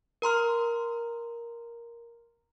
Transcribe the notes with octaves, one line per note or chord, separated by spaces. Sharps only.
A#4 A#5 C6 F6